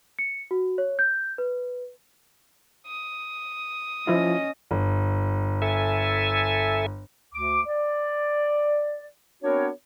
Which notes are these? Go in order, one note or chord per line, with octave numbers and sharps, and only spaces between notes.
C#7
F#4
C#5
G6
B4
D#6
F3 C#4 E4 F4 D#5
G1
A4 E5 G#5
D2 D6
D5
B3 C4 D4 F#4 A#4 C#5